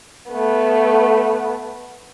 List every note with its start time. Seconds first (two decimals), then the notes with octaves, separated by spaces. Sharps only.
0.31 A3 B3